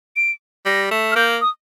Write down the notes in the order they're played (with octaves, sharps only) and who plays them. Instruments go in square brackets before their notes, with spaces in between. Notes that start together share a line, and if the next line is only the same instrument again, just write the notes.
[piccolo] D7
[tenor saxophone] G3 [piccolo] A#6
[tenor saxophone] A3
[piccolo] F6
[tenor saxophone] A#3 [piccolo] G6
[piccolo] D#6